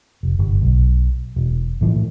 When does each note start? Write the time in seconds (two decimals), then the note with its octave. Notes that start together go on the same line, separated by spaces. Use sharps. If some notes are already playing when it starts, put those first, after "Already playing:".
0.23 F1
0.39 G1
0.62 B1
1.36 E1
1.81 A2 E3 F3